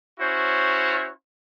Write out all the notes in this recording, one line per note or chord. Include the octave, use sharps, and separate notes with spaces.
C#4 E4 F#4 C5 C#5